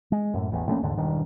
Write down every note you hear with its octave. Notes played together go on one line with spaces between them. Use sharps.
G#3
F#2 A2
A1 E2
A#1 A3 A#3 C#4
D#2 G#2 D3
E1 G2 D#3